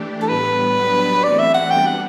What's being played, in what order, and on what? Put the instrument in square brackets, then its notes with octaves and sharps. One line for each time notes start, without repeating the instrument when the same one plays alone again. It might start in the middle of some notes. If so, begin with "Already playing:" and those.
Already playing: [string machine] E3 A3 D4 G4
[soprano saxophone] A4
[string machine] A2 G3 B3 [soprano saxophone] B4
[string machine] F#3 B3 D4 G4
[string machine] E3 A3 C4 F#4 [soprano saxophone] D5
[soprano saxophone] E5
F#5
[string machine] G3 B3 D4 [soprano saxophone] G5
[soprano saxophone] F#5